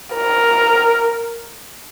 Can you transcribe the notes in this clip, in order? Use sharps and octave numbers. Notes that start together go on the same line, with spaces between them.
A#4